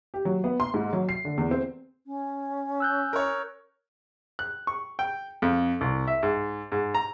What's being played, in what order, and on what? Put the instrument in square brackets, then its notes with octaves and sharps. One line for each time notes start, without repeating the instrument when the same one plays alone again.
[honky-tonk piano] G4
F#3
B3
C6
G#2
F#3
C7
D3
E2
C4
[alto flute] C#4
[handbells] E6 F#6 G6
[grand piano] A#4 C#5
[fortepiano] F#6
C#6
G5
F2
C2
E5
G#2
G#2
A#5